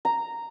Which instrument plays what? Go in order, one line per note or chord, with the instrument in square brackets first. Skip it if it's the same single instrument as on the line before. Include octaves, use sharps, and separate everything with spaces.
[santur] A#5